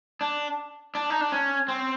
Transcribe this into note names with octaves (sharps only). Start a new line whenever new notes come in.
D4
D4
D#4
D4
C#4
C4